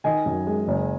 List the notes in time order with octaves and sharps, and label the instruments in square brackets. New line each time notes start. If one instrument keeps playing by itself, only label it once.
[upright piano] D#3 [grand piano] D#5 G#5
[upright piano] F#2
G#3
F#1